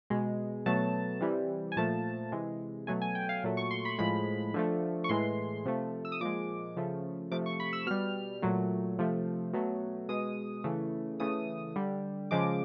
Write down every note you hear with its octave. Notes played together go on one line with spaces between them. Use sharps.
B2 G#3
B2 F#3 A3 A5
C3 E3 G3
G#5
A#2 F3 A3 A5
C3 E3 G#3
B2 F#3 A3 G#5
G#5
G5
F5
A#2 F#3 A3
C#6
C6
B5
A2 F3 G#3 B5
D3 F3 A3
C#6
A2 E3 G#3 C6
C3 F3 A3
E6
D#6
A#2 F3 G#3 D6
C#3 F3 A3
C3 F3 A3 D6
C#6
B5
E6
B2 G3 F6
A#2 F#3 A3
C3 F3 A3
B2 F#3 A3
B2 G#3 D#6
C#3 E3 A3
C#3 E3 A3 D#6
D3 G3
C#3 F3 G#3 D6